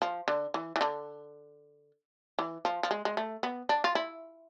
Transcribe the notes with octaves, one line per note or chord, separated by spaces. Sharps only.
F3
D3
E3
E3
D3
E3
F3
F3
G#3
G#3
A3
B3
D4
F4
E4